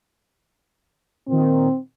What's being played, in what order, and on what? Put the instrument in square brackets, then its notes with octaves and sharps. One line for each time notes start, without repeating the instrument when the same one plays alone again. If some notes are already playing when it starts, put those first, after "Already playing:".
[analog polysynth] A#2 D#3 [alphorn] C4